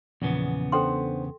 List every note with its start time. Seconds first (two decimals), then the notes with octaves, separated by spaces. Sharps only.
0.22 E2 A#2 C#3 F3 B3
0.72 D4 A4 C5 F#5 G5 C6